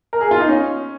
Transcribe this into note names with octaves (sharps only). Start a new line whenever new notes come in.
A#4
G#4
F4
D#4
C#4